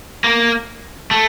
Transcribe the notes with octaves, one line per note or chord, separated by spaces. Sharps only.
A#3
A3